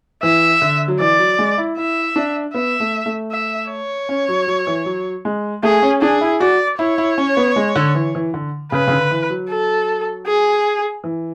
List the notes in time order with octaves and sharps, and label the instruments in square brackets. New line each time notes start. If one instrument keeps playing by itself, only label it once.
[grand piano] E3 [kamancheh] E5
[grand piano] D3
F#3
[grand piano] E3 [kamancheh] D5
[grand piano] F#3
G#3
E4
[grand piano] E4 [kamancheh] E5
[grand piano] D4
[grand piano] B3 [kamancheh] E5
[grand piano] A3
A3
[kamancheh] E5
C#5
[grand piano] C#4
F#3
F#3
E3
F#3
G#3
[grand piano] A3 [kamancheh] G#4
[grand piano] C#4
[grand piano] D4 [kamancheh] G#4
[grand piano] E4
[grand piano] F#4 [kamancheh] D5
[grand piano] E4 [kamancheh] C#5
[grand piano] E4
C#4
B3
G#3
D3
E3
E3
D3
[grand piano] C#3 [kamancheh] B4
[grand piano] C#3
D3
E3
F#3
[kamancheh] A4
G#4
[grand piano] E3